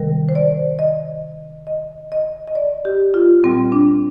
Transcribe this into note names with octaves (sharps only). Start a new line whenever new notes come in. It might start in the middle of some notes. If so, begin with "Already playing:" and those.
Already playing: C3 D#3 G3 A#4
C5
D5
D#5
D#5
D#5
D#5
D5
G4
F4
A#2 G3 C4
D4